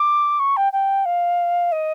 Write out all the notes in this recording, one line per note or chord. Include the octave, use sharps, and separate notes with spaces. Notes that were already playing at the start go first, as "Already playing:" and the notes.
Already playing: D6
C#6
G5
G5
F5
D#5